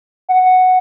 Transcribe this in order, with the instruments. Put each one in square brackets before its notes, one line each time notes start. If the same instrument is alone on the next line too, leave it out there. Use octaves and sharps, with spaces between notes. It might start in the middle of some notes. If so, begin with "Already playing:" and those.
[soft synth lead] F#5